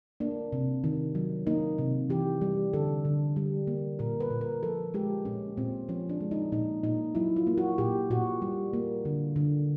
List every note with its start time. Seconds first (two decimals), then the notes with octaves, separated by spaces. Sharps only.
0.20 A#3 D4
0.52 C3
0.84 D#3
1.15 F#3
1.47 A#3 D#4
1.78 C3
2.10 E3 G4
2.41 G3
2.73 D3 A4
3.05 D3
3.36 G3
3.67 A#3
3.99 A#2 A#4
4.20 B4
4.30 A#2
4.41 A#4
4.63 F3 A4
4.94 G#3 G4
5.25 A#2 C#4
5.57 A#2 C4
5.89 F3 C#4
6.09 D4
6.21 G#3
6.31 D#4
6.52 A#2 D#4
6.83 A#2 D#4
7.15 F#3 E4
7.36 F4
7.47 A#3
7.58 F#4
7.78 A#2 G4
8.11 A#2 F#4
8.42 G3
8.73 A#3
9.05 D3
9.36 D3